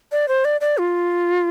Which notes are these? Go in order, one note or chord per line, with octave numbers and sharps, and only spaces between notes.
D5
C5
D5
D5
F4